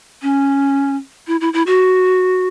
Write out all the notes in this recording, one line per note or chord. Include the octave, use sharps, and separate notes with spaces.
C#4
E4
E4
E4
F#4